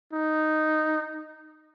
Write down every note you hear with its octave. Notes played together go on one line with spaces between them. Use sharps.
D#4